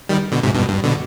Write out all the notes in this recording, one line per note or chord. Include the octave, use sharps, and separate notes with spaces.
D#3 G3
B2 D3
G#2 C3
G2 B2
G2
B2 D3